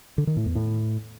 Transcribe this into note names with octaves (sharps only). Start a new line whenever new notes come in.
D3
D#3
A2
E2
A2